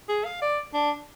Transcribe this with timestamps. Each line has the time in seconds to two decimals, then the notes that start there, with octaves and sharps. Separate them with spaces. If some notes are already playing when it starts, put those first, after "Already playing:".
0.09 G#4
0.24 F5
0.42 D5
0.74 D4